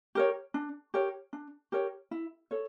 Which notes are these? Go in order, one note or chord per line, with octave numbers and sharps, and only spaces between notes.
G4 A#4 C#5
D4
G4 A#4 C#5
D4
G4 A#4 C#5
E4
A4 C#5